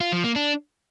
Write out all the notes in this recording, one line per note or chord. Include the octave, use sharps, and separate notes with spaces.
F4
F3
A#3
D4